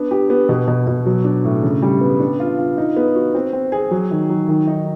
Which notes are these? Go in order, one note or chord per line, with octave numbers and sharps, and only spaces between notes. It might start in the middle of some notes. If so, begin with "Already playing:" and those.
Already playing: B3 D4
G4
B3
B2
B2
B2
F#3
D4
A2
C#3
G3
B3
D4
F4
F4
D#4
B3
F#4
C4
C4
G#4
F#3
D#3
F#3
D#3
D#4